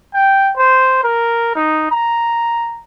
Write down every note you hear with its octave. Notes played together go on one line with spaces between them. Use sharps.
G5
C5
A#4
D#4
A#5